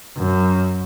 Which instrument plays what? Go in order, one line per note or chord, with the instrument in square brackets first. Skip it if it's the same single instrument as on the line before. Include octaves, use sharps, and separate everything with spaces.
[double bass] F#2